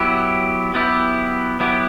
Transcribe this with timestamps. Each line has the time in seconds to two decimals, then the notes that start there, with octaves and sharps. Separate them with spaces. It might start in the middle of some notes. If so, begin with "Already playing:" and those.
Already playing: F#3 B3 E4 G4
0.74 F#3 B3 E4 G4
1.60 F#3 B3 E4 G4